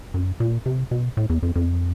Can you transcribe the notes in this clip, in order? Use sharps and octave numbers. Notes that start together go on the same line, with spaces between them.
F#2
A#2
C3
B2
A2
E2
F2
F2